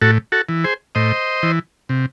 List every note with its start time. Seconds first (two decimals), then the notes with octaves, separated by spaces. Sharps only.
0.02 A2 F#4 A4
0.32 F#4 A4
0.49 E3
0.64 G#4 C5
0.95 A2 C5 D#5
1.43 E3
1.89 C3